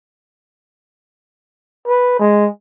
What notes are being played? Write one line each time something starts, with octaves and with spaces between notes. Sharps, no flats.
B4
G#3